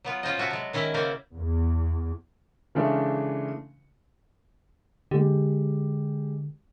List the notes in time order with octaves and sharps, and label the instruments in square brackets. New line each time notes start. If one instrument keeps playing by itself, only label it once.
[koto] F#3 B3 F4
C#4 F4 C5 D#5
C3 B3 F#4 E5 A5
F#3 G#3
D#3 C#4 E4 E5
C#3 A#3 C#4 C5 D5 A#5
[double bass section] E2
[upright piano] C#3 E3 G#3 A3 C#4 D4
[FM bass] D3 [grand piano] G#3 G4